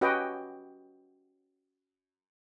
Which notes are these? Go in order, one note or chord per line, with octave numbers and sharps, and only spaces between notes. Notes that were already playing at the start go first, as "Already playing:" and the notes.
C#4 F#4 G4 B4 D#5 G5